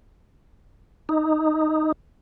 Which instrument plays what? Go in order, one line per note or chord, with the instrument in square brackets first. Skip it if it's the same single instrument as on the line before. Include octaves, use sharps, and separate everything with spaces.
[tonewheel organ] D#4